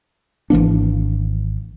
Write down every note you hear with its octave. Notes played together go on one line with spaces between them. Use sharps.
G#1 E3 A#3 D4